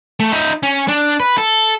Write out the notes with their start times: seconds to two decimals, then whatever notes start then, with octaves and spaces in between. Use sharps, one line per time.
0.20 A3
0.32 D#4 E5
0.63 C#4
0.88 D4
1.20 B4
1.38 A4